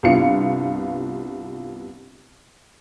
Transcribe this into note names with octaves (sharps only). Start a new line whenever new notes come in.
C2 G2 B3 F4 F5 C#7